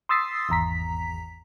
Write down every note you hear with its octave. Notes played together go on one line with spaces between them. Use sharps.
C6 D#6 E6 A6 B6 C7
G#1 E2 A#5 B6